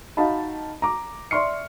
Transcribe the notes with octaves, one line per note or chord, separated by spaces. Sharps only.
D#4 F#4 D#5 F5 A5 B5
A#5 D6
D5 E5 C6 C#6 F6 C#7